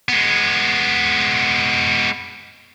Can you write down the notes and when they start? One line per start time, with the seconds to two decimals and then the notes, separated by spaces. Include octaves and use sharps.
0.09 G#3 B3